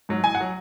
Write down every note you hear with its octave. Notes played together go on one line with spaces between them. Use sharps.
G#2 F#3
A1 G#5
F#5
F#3